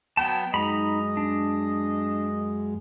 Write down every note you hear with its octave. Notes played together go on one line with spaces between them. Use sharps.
F#3 B3 G5 A5
F#2 G#3 D#4 D#5 A#5 B5
D4